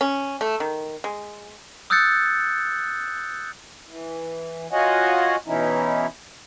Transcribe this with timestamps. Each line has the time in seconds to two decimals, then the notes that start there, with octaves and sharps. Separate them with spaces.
0.01 C#4
0.41 A3
0.60 D#3
1.04 G#3
1.90 D#6 E6 F#6 G6 A6 C#7
3.86 E3
4.72 F4 F#4 C#5 D#5 F#5 G#5
5.47 B2 E3 C#4 D#4 E4